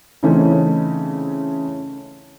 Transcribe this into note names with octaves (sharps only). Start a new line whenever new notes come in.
C#3 E3 A3 C4 C#4 D#4